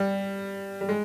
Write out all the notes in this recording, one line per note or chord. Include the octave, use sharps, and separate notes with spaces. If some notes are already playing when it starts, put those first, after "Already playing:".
Already playing: G3
G3
G#3